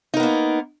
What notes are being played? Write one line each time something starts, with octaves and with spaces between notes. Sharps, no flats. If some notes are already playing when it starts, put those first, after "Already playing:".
A#3 B3 D#4 A#4